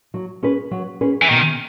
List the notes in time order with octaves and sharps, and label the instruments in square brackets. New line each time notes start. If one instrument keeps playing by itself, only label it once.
[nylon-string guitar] F#3
C#4 G#4 B4
F#3
C#4 G#4 B4
[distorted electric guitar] E3
[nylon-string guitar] B2 [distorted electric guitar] D#3